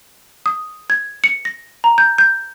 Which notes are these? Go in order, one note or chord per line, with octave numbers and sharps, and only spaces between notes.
D#6
G#6
C#7
A#6
A#5
G6
G6